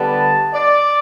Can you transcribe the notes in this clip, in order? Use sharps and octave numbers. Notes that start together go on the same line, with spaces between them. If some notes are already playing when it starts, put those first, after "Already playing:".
Already playing: D3 G3 B3 A5
D5